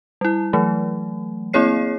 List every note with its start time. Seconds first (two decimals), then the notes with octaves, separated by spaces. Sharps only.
0.21 G3 E4
0.53 E3 F#3 A3
1.53 A#3 C4 E4 G#4 C#5 C7